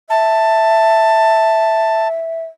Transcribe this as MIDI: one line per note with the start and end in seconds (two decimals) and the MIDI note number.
0.10 2.44 76
0.10 2.08 81